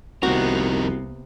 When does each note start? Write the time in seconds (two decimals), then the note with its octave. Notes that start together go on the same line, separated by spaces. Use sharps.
0.23 C2 F2 C3 A#3 B3 D#4 F#4 A#4